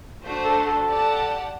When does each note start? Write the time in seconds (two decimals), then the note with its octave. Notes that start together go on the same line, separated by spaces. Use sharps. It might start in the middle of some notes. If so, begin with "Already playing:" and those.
0.23 A3 D4 F#4 C5
0.45 A4
0.66 A4
0.87 G4 D5 F#5 A5